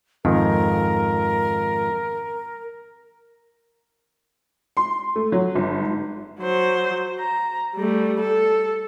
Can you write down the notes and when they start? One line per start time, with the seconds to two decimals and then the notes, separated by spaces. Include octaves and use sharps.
0.25 F2 G#2 D#3 A#4
4.77 C6
5.16 A3
5.32 F#3
5.55 G1
5.81 G#2
6.40 F#3 C5
7.19 A#5
7.75 G3 A3
8.21 A4